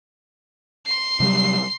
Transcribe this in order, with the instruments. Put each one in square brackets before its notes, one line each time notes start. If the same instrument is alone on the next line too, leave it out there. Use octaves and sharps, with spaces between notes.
[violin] C6 C7
[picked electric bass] C3 F#3 G3